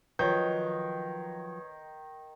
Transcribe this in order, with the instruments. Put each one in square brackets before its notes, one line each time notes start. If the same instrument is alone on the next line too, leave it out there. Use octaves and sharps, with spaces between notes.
[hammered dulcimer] D#3 [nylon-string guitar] F3 F#3 [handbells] B4 [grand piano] C#5 G6